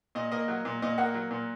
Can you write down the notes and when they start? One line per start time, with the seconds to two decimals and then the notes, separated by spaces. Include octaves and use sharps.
0.15 A#2 D#5
0.32 A#3 D#5
0.48 F#3
0.65 A#2
0.82 A#2 D#5
0.98 A#3 F#5
1.14 F#3
1.31 A#2